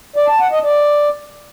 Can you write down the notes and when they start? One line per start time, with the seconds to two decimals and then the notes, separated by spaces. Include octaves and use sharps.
0.16 D5
0.28 A5
0.40 F#5
0.52 D#5
0.63 D5